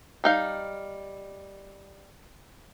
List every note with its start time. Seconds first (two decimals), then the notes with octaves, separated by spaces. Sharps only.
0.24 G3 D#4 F5